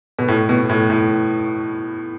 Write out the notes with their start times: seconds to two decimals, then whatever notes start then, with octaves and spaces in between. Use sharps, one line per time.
0.19 B2
0.28 A2
0.49 B2
0.69 A2
0.90 A2